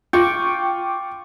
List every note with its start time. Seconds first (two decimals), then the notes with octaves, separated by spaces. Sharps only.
0.13 F4 G5 C#6 D6